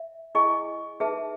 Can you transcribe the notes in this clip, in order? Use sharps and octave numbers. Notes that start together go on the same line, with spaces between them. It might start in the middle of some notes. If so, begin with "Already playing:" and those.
Already playing: E5
E4 G#4 D#5 G#5 C#6
D#4 G#4 B4 E5 A5